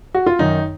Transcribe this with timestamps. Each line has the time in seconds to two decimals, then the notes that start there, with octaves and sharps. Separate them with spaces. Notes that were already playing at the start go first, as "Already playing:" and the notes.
0.14 F#4
0.27 F4
0.39 F#2 D#3 D#4